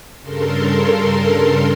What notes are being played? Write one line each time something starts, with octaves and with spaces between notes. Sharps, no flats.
G2 C#3 A4 A#4 C6